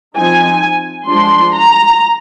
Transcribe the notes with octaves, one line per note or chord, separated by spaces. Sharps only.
F3 C4 D#4 G#5
F3 G#3 D4 C6
A#5